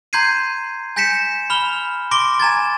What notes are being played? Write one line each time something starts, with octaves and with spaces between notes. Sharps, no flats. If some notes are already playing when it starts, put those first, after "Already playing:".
A#5 C6 G6 G#6 C7 D#7
G#5 G6 A#6 B6 C#7 E7
B5 F6 G7
C6 D6 A#6 D7 G7
G#5 A#5 G#6 A6